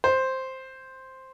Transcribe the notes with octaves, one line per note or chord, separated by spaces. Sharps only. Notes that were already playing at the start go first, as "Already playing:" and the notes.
C5